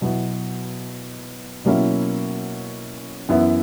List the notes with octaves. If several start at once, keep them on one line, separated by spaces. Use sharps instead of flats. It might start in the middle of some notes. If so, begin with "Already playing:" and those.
B2 F#3 B3 E4
B2 F#3 A#3 C#4 E4
F#2 E3 B3 E4